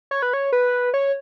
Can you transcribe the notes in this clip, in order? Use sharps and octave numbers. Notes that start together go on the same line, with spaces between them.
C#5
B4
C#5
B4
C#5